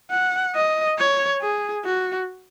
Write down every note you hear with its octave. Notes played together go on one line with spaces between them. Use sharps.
F#5
D#5
C#5
G#4
F#4